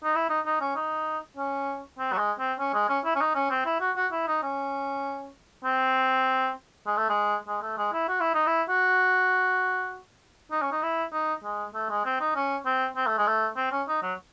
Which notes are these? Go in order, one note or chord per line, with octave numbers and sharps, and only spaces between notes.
D#4
E4
D#4
D#4
C#4
D#4
C#4
C4
F#3
G#3
C4
C#4
G#3
C#4
E4
C#4
D#4
C#4
C4
E4
F#4
F#4
E4
D#4
C#4
C4
G#3
A3
G#3
G#3
A3
G#3
E4
F#4
E4
D#4
E4
F#4
D#4
C#4
D#4
E4
D#4
G#3
A3
G#3
C4
D#4
C#4
C4
C4
A3
G#3
A3
C4
C#4
D#4
F#3